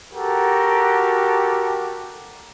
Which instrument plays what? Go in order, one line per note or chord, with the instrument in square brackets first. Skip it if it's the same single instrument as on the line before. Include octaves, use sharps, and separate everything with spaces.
[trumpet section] F#4 G4 A4 A#4